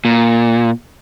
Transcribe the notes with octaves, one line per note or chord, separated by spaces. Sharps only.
A#2